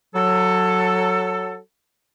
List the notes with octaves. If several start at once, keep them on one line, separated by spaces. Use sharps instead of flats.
F#3 A4